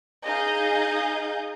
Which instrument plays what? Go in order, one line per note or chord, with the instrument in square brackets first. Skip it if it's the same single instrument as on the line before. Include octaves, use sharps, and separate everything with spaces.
[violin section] D#4 G#4 D#5 F5 D#6 G6